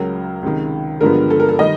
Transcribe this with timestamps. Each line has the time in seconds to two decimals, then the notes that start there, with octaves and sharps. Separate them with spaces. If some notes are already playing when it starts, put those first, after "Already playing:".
Already playing: C#2 C#3 F#3 A#4
0.43 C#2 C3 D#3
1.01 G2 D3 F3 G#3 B3 A#4
1.30 A4
1.40 A#4
1.49 A4
1.59 D#3 G3 D#5